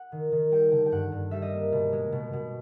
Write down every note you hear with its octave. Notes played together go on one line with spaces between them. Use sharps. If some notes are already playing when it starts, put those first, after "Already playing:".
Already playing: F#5
D#3
D#3
G3 G5
D3 G5
G5
G2 F#5
G2
G3 E5
D#5
A#3
B2
G#3
B2
B2